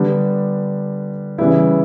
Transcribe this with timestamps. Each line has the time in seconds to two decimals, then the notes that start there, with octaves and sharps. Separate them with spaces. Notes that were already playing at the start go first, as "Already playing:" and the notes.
Already playing: D3 G3 B3 D4
1.38 C#3 E3 G3 B3 E4